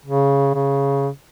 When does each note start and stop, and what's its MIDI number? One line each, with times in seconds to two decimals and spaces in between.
0.05 0.54 49
0.54 1.09 49